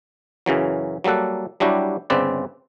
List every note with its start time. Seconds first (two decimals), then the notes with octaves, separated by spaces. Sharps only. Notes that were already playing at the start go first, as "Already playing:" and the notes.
0.46 F#2 C#3 E3 F#3
1.04 F#3 G3 A#3 A4 F#5
1.60 F#3 G3 D4 E4 F#4 G4
2.10 G1 C#3 C4 B4 D5